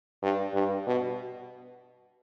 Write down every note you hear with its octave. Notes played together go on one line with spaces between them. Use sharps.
G2
G2
B2